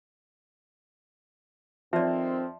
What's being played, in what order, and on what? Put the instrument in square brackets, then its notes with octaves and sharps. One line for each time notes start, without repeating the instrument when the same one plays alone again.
[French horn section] F2 D#3 C4 [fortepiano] F3 [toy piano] D5 E5